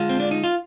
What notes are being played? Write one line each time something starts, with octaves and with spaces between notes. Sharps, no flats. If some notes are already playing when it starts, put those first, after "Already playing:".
Already playing: D3 G#3 F4
C4
D4
D#4
F4